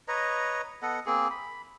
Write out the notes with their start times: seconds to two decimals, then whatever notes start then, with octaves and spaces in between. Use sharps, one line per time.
0.08 B4 C#5 D#5 A#5
0.82 B3 A4 D#5 F#5
1.06 A#3 C4 G#4
1.31 B5